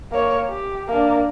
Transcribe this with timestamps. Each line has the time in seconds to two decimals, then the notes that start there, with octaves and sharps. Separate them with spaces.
0.11 A#3 C#5
0.48 G4
0.88 A#3 D4